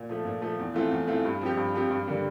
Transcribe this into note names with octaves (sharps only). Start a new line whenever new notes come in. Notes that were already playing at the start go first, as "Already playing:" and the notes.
Already playing: A#2
F3 A3
A#2
F3 A3
E2
E3 A3 C4 F4
E2
E3 A3 C4 F4
G2
F3 C4 G4
G2
F3 C4 G4
G2
D3 G3 A#3